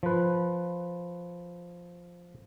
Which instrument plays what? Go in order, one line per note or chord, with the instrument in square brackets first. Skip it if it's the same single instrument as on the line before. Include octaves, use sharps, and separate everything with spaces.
[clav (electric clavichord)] F3 B4